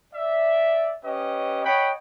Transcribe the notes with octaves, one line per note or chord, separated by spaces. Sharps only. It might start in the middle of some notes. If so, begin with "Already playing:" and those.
D5 E5
C#4 G4 B4 D#5
C#5 D#5 F#5 G5 B5